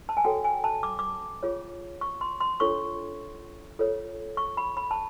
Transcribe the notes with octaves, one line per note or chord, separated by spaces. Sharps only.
A5
G#5
F#4 A4 C#5 G5
G#5
A5
D6
D6
F4 G#4 C#5
C#6
C6
C6
D4 F4 A4 C#5 C#6
F4 A4 C#5
C#6
B5
B5
A5